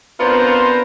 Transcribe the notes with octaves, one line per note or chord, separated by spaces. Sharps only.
B3 C4 D4 F4 A#4 C5